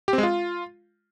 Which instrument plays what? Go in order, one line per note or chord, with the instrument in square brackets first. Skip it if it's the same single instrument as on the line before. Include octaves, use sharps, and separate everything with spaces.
[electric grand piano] G4
C4
G#3
F4